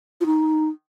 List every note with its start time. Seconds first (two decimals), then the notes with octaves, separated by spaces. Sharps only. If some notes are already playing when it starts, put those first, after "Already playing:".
0.21 F4
0.26 D#4